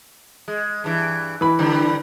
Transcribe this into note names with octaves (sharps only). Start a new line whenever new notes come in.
G#3
G2 E3
E3 B5
D3 G3 C4